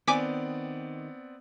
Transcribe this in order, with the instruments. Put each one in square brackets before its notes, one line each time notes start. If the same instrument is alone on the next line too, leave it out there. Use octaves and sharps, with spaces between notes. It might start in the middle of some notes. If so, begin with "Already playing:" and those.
[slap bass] D#3 [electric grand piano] B3 C4 D5 [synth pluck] G#5 D6 B6